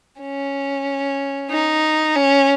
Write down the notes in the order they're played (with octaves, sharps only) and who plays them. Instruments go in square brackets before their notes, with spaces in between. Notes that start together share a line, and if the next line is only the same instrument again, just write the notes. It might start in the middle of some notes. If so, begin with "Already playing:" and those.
[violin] C#4
D#4
C#4